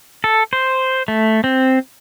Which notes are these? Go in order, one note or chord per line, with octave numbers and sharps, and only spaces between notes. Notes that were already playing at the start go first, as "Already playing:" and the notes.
A4
C5
A3
C4